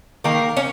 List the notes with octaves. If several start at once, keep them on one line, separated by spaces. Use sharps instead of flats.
D#3 A#3 A#4
C#4